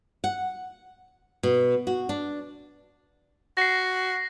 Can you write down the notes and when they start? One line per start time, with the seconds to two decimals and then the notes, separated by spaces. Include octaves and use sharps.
0.24 F#5
1.43 B2
1.87 F#4
2.09 D4
3.57 F#4 A#6 C7